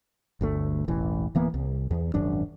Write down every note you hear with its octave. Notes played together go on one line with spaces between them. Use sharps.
G1 D2 A3
E1 A1 E3
D1 E3 A#3 B3
C2
E2
D#1 G#1 F#2 D4